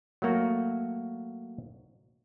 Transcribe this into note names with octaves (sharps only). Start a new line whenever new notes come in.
F#3 A3 A#3 F#4